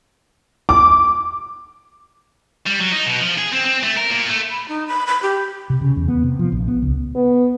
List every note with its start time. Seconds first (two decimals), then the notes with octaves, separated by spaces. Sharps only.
0.69 D6
2.66 G3
2.80 F#3
2.92 D#4
3.06 B2
3.20 F3
3.38 G#4
3.53 C4
3.65 C4
3.84 A3
3.97 A#4
4.10 A#2
4.30 A3
4.50 B5
4.69 D#4
4.88 B5
5.07 B5
5.23 G4
5.70 C3
5.81 C#3
5.96 E2
6.08 B3
6.24 C3
6.39 F3
6.52 A#1
6.68 B3
6.82 C#2
7.15 B3